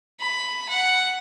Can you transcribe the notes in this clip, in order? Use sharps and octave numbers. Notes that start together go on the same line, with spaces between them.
B5
F#5